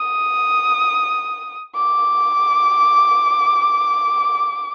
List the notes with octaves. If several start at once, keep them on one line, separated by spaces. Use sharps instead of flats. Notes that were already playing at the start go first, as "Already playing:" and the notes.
Already playing: D#6
D6